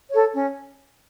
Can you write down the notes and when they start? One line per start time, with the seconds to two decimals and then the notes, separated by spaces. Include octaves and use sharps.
0.11 A4 C#5
0.33 C#4